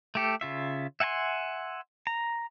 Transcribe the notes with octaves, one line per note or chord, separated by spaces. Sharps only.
A3 G4 A4
C#3 F4 E5
E5 F#5 G#5 A5 C6
A#5